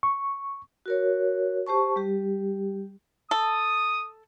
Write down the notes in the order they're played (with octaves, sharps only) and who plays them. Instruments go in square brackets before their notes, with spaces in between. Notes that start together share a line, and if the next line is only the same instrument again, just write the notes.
[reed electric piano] C#6
[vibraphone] F#4 A#4 C#5
G4 C5 A5 C#6
G3 G4
[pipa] A4 [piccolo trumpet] D#6